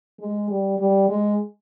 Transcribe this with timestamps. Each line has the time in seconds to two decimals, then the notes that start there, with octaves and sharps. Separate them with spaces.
0.20 G#3
0.50 G3
0.79 G3
1.09 G#3